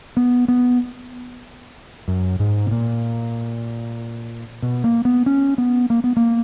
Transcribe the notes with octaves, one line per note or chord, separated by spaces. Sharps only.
B3
B3
F#2
G#2
B2
A#2
B2
A#3
B3
C#4
B3
A#3
B3
A#3